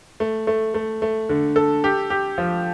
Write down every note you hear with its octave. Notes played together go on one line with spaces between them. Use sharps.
A3
A3
A3
A3
D3
A4
G4
G4
F3